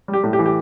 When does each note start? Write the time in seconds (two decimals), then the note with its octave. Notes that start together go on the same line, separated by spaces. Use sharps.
0.08 G3
0.13 G4
0.24 A2
0.33 G4
0.39 E3
0.46 G4